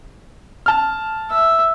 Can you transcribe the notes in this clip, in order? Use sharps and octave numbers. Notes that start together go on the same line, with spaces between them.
A5 F6
E5